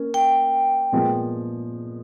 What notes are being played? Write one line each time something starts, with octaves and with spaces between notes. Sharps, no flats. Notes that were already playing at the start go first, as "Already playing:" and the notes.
Already playing: A#3 C#4
G5
A#2 F3 G#3 B3